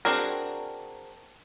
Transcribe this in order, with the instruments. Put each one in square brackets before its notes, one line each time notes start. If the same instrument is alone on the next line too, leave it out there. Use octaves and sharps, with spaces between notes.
[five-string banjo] C4 D4 F#4 G#4 A#4